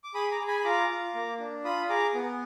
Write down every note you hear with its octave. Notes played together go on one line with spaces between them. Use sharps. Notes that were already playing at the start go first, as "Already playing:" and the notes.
D6
G#4 B5 D#6
A#5 D6
G#4
G#5 B5
B5
F4 A#5 D6
F4
A#3
D4
F4 B5 D#6
G#4 A#5 D6
B3